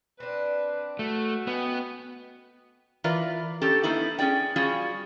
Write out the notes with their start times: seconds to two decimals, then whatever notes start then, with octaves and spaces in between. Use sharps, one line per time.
0.20 C4 D4 B4
0.99 A3 F#4
1.47 B3 C#4 D#5 G5
3.04 E3 F4 A#4 B4 D5
3.62 C#4 G4 A4
3.83 A#3 B3 D#4 E4
4.19 C#4 G#4 D5 G5
4.56 G3 C#4 F4 F#4 G#4